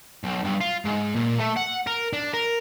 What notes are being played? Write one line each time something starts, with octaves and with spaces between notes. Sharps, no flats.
B1
G2
F4
G#2
A#2
A3
F#5
A#4
D4
A#4